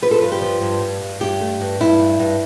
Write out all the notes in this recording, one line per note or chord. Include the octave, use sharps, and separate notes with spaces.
F3 B4
A4
G2 B4
G4
F3
G2
G2
G2
G2 G4
A3
G2
G2 E4
G2
G2